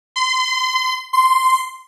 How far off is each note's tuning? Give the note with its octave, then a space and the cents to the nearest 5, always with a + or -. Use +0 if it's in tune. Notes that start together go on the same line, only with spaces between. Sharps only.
C6 -30
C6 -10